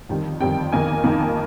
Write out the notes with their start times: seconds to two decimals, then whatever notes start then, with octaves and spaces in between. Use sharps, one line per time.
0.09 F2 D#3 G3 C4
0.40 F2 D#3 G3 C4 G5
0.72 F2 D#3 A#3 D#4 G#5
1.04 F2 D#3 A#3 D#4